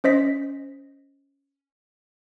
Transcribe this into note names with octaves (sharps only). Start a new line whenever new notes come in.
C#4 C5 D#5 B6